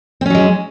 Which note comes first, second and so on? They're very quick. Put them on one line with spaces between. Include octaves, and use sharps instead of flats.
C4 C#4 F#3 G#3